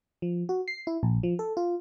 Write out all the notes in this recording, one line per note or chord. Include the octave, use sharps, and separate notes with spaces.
F3
F#4
C7
E4
A#1
F3
A4
F4